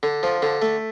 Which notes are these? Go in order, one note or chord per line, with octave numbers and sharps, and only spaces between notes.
D3
F3
D3
A3